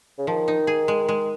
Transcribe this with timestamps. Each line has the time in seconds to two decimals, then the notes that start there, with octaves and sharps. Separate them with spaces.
0.18 C#3
0.27 D#3 F3
0.48 D#4
0.67 G#4
0.88 G#3
1.08 G#3